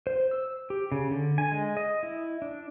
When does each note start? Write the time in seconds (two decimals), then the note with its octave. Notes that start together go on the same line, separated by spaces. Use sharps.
0.07 C5
0.31 E6
0.70 G4
0.92 C#3
1.11 D3
1.38 G#5
1.52 G#3
1.77 D#5
2.03 E4
2.42 D4